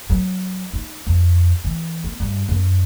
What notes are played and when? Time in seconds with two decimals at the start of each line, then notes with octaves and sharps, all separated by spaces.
0.10 F#3
0.73 D#4
1.07 F2
1.65 E3
2.04 B3
2.20 G2
2.49 F#2